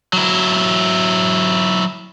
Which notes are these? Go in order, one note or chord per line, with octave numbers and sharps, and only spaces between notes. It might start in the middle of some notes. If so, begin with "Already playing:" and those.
F#3 E4